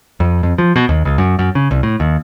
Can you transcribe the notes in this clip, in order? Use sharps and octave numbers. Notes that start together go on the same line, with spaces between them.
F2
F2
F3
B2
D#2
C#2
F#2
F#2
C#3
C2
A2
D#2